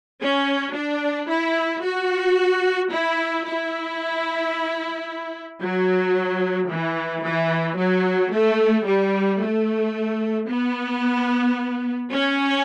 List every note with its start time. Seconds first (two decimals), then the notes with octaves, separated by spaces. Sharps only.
0.21 C#4
0.75 D4
1.29 E4
1.83 F#4
2.92 E4
3.46 E4
5.62 F#3
6.70 E3
7.24 E3
7.77 F#3
8.32 A3
8.86 G3
9.41 A3
10.48 B3
12.11 C#4